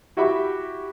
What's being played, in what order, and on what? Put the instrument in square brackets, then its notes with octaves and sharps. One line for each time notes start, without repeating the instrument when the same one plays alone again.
[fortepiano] E4 F#4 G4 E5 B5